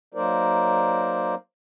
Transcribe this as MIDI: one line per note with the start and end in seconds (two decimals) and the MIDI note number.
0.14 1.35 54
0.14 1.35 58
0.14 1.35 63
0.14 1.35 70
0.14 1.35 72
0.14 1.35 74